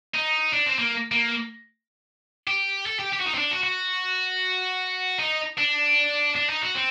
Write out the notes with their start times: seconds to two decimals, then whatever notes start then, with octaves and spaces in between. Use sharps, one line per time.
0.14 D#4
0.53 D4
0.66 C4
0.79 A#3
1.12 A#3
2.47 G4
2.86 A4
2.99 G4
3.12 G4
3.20 F#4
3.25 D#4
3.34 C4
3.38 D4
3.51 F#4
3.64 F#4
5.19 D#4
5.58 D4
6.36 D4
6.49 D#4
6.62 F#4
6.75 C4